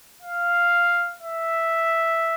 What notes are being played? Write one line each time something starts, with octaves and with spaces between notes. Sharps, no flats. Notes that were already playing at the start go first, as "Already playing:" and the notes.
F5
E5